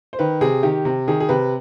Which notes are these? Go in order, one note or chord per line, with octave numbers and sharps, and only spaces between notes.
C5
D#3 B4
C3 G#4
D#3 G4
C3
D#3 G#4
G#4
C3 B4